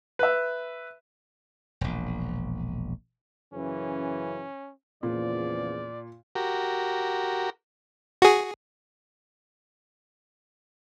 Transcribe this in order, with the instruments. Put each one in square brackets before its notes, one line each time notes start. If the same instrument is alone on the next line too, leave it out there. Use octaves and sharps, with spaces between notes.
[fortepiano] B4 E5
[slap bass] E1 A#1
[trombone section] F#2 C#3 E3 [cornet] C#4
[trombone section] E2 C#3 F3 [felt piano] A#2 [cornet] D5
[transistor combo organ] F#4 G4 A#4
[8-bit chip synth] F#4 G#4